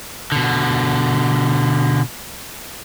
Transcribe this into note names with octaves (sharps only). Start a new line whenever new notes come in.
B2 D3